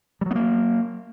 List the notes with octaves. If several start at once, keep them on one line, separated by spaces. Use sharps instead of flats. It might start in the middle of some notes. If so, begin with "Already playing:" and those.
F#3 G3 A#3 B3